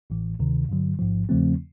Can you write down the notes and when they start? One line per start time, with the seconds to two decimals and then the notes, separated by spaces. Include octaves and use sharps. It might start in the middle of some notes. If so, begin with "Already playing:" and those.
0.10 A1 A2 E3
0.39 D2 C3 D#3
0.69 G2 D3 F#3
0.99 A1 G#2 F3
1.29 E2 C#3 F3 A3 C4